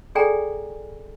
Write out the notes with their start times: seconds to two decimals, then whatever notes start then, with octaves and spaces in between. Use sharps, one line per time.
0.15 G#4 A4 D5 G5 G#5 A#5